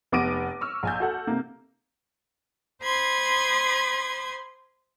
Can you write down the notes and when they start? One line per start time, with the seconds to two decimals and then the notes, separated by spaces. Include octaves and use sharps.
0.12 F1 B3 D6 A#6 D7 D#7
0.61 C#6 E6 F6
0.83 A#1 G#5 G6
1.00 F#4 A4 F#5
1.27 C3 A#3
2.81 C5 B5 C6 D#6 G#6